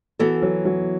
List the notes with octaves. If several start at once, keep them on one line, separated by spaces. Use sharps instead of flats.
E3 B3 F#4 A4
F#3
F#3